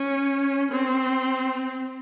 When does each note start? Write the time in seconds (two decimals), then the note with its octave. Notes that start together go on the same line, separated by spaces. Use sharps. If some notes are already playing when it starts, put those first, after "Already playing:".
Already playing: C#4
0.72 C4